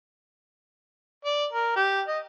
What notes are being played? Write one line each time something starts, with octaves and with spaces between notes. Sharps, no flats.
D5
A#4
G4
D#5